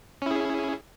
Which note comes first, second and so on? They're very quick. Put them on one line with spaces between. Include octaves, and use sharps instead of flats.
C#4 E4 G#4